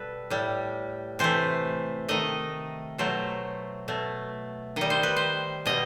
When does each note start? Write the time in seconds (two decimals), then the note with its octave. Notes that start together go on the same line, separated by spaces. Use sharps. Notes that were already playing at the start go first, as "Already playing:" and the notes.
Already playing: B2 G3 A4 B4
0.30 A2 G3
1.19 C3 E3 A3 C5
2.09 D#3 A3 D#5
2.98 B2 F#3 A3 C5
3.88 B2 A3
4.76 D#3 G3 D#5
4.90 C5
5.03 B4
5.16 C5
5.66 B2 G3 D#5